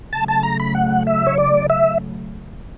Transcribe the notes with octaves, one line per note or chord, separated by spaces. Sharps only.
C#3 F#3 A3 A5
A5
A#5
B5
F#5
E5
C#5
D5
E5